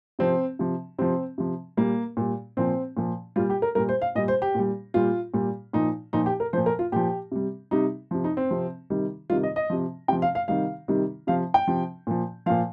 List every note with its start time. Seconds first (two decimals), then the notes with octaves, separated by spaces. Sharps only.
0.19 C3 F3 C4
0.59 C3 F3
0.98 C3 F3 C4
1.38 C3 F3
1.77 A#2 G3 A#3
2.17 A#2 G3
2.57 A#2 F3 C4
2.97 A#2 F3
3.36 A#2 G3 F4
3.50 G4
3.62 A#4
3.75 A#2 G3 A#4
3.89 C5
4.02 F5
4.15 A#2 G3 D#5
4.28 C5
4.42 G4
4.55 A#2 G3
4.94 A#2 G3 F4
5.34 A#2 G3
5.73 A#2 F3 D#4
6.13 A#2 F3 D#4
6.26 G4
6.40 A#4
6.53 A#2 F3 C5
6.66 A#4
6.79 F4
6.92 A#2 F3 G4
7.32 C3 G3
7.71 C3 G3 D#4
8.11 C3 F3
8.24 D#4
8.37 C4
8.51 C3 F3
8.90 C3 D#3 G3
9.30 C3 D#3 G3 F4
9.43 D#5
9.56 D#5
9.70 C3 F3
10.08 C3 F3 G5
10.22 F5
10.35 F5
10.48 C3 D#3 G3 F5
10.88 C3 D#3 G3
11.27 C3 F3 F5
11.54 G5
11.67 C3 F3
12.07 A#2 F3
12.46 A#2 F3 F5